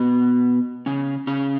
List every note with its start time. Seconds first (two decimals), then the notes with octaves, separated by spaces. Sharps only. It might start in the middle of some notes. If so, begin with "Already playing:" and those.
Already playing: B2 B3
0.86 C#3 C#4
1.27 C#3 C#4